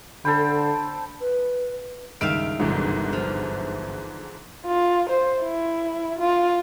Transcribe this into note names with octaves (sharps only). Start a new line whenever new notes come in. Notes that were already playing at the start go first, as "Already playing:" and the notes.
D3 A4 C5 G5 B5
B4
C#2 G2 D#3 E5 F5 D7
G1 C2 G#2 D3 E3 F#3
F3
F4
C5
E4
F4